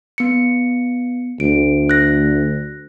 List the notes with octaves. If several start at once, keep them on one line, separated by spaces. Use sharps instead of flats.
B3 C#7
D2 D7
F#6 A#6